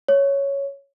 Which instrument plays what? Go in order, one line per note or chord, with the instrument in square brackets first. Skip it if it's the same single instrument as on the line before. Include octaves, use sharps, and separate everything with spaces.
[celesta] C#5